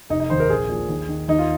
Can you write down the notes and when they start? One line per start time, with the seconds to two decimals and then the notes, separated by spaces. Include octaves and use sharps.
0.10 F1 D#4
0.20 D#4
0.30 D#2 D#3 C5
0.40 A#4
0.50 A#1 G#4
0.69 A#2 F3
0.88 D#2
1.09 D#3
1.28 D#2 D#4
1.39 F4